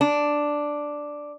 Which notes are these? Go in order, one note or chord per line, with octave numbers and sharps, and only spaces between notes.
D4